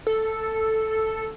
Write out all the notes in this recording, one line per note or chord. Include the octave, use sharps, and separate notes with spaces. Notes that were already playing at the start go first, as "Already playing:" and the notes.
A4